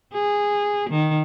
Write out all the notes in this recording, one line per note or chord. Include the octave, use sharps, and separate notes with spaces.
G#4
D#3